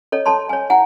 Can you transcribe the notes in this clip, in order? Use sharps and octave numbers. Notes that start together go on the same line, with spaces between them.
A4 C#5 D#5
A4 C#5 A5 C6
C#5 G#5
E4 F#5 G#5